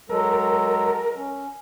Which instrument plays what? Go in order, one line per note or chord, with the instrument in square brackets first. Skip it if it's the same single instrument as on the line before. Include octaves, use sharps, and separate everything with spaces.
[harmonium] F#3 G#3 A4 [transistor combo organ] A#4
[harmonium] C#4